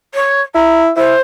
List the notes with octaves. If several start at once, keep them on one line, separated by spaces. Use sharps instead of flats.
C#5
E4 A#5
E4 C5